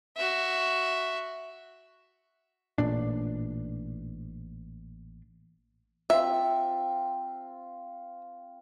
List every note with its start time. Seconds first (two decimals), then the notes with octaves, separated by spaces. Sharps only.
0.17 F#4 E5
2.78 A1 A#2 D4
6.10 C4 F4 E5